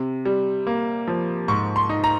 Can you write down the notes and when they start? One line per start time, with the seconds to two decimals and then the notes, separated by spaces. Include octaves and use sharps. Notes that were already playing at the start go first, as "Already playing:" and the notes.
Already playing: C3
0.26 G3
0.67 A#3
1.08 F3
1.48 G#2 C#6
1.76 C6
1.89 D#4
2.04 A#5